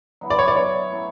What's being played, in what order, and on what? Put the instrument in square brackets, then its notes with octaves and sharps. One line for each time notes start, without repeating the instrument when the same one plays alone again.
[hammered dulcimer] D3 F#3 B3 E4
[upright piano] D5
C#5
D5
[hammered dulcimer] B2 F#3 B3 E4 [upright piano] C#5
[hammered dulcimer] A2 F#3 C#4